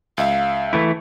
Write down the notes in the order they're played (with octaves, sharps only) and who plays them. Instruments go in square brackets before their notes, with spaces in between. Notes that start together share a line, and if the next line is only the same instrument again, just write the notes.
[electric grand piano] C#2 E5 [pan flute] F5
[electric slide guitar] E3 A3 E4